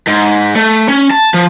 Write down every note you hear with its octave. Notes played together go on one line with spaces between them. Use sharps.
G#2
A3
C#4
A5
F3